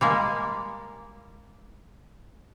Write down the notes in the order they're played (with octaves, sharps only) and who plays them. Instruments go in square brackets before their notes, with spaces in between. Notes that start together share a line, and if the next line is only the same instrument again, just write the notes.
[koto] G3 G#3 A#3